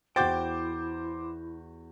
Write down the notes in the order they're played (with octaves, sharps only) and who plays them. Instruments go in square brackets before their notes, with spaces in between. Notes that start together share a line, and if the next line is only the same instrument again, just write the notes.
[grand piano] E2 F#4 A6 [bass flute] E4 [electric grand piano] C5 D6 G6 [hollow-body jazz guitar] G5